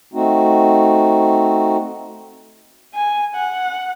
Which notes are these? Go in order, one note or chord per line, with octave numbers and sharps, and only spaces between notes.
A3 C4 D#4 F#4
G#5
F#5